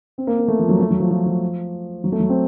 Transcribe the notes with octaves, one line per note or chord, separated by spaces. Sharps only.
C4
A#3
A#3
A3
F3
F#3
A3
F#3
F3
F3
F3
F#3
A3
F#3
C4